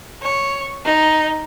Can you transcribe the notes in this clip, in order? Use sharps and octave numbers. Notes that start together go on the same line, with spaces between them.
C#5
D#4